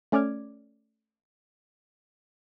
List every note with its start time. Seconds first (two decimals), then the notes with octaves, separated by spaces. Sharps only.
0.12 A3 C#4 D5 D6 F6 G#6